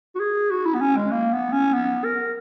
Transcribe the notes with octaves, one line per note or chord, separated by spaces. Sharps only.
F#4
G#4
F#4
E4
B3
C#4
G#3
A#3
B3
C#4
B3
A#4